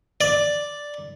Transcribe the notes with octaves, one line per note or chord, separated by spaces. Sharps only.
D5